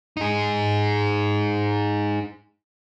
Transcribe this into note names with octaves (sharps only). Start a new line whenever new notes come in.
D#4 G#4